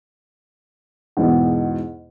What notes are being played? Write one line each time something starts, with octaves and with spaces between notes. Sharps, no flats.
E2 G#2 B2